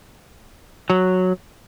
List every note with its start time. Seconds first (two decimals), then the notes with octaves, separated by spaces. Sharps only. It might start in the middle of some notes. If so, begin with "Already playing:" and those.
0.90 F#3